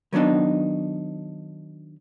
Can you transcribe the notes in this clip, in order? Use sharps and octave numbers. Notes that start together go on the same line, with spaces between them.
D#3 F#3 B3 D4 D#4